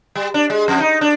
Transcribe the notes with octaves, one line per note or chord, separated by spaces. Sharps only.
G3
D4
G#3
F2
D#4
D4